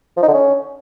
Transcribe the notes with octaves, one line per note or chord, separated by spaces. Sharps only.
F3
D#4
D3
C#4